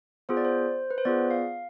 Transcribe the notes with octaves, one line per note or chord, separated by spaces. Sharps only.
B3 F4 G#4 C5
D5
C5
B4
C5
B3 F4 G#4 D5
F5